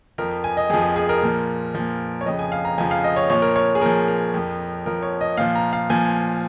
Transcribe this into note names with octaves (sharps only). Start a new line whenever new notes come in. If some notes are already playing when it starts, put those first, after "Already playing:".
F2 F3 A#4
G#5
D#5
F2 F3 G#4
G#4
G#4
A#4
A#2 F3
A#2 F3
C#5
F2 C#3 F3 D#5
G#5
F5
A#5
F2 C#3 F3 G#5
F5
D#5
C#5
A#2 F3 C#5
A#4
C#5
G#4
A#2 F3 A#4
A#4
F2 F3
F2 F3 A#4
C#5
D#5
A#2 F3 F5
A#5
F5
A#2 F3 G#5